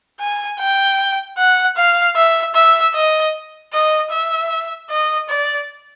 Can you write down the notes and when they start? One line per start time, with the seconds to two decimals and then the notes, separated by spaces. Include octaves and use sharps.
0.20 G#5
0.59 G5
1.38 F#5
1.77 F5
2.16 E5
2.55 E5
2.94 D#5
3.73 D#5
4.11 E5
4.90 D#5
5.29 D5